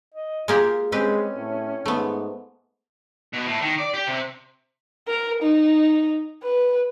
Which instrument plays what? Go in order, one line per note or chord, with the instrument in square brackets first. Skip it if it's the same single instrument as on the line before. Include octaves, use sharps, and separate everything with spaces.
[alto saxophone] D#5
[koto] G#3 A#3 G4 [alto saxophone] F4
[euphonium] G#3 [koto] C4 G4 B4 [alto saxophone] C#4
[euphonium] A2
[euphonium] G#2 [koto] A3 B3
[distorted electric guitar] B2
A2
D#3
D5
G4
C3
[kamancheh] A#4
D#4
B4